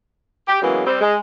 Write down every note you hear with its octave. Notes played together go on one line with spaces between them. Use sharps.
G4
C#3 E3 F#3 G#3 A#3 B3
G3 C4
G#3